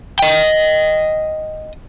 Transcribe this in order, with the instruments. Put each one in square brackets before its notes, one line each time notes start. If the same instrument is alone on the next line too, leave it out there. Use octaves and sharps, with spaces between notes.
[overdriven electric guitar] D#5 G5